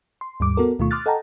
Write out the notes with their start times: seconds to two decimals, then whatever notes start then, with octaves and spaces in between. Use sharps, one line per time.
0.21 C6
0.40 D#2 G#2 G3 D6
0.57 B3 F#4 A4 A#4
0.79 D2 B2 D#3 A3 F4 C#6
0.91 C6 D6 D#6 F6 F#6 A6
1.06 A4 D#5 F#5 G5 A5 A#5